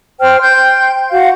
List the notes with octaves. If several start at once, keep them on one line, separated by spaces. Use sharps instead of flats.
C5 G5 F6
G5 C6 G6
F#4 F5